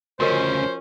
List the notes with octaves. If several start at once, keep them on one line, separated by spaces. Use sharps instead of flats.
D2 C#3 F3 C#4 F#4 A#4 C5 D#5